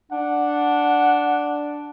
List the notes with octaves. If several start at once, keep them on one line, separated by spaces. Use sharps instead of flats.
D4 F#5